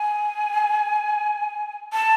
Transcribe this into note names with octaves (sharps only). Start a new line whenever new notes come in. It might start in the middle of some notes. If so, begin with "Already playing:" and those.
Already playing: G#5
A5